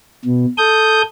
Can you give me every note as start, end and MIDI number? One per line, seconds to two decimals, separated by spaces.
0.25 0.46 47
0.58 1.02 69
0.58 1.02 87
0.58 1.02 91